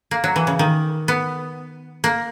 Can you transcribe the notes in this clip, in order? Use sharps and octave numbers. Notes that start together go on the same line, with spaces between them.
A#3
F#3
E3
C#3
D#3
B3
A#3